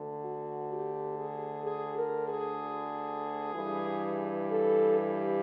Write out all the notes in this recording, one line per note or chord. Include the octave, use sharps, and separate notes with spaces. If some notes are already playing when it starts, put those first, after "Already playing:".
Already playing: D2 D3
F#4
G4
G#4
G#4
A#4
G#4
G2 E3
A4
G4